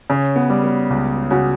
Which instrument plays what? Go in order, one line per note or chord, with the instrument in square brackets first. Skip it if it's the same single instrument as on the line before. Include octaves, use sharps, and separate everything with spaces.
[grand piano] C#3 [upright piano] C#4
[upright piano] B3
[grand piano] G3
[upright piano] B3
[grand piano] C#2
[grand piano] C#3 [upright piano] F#4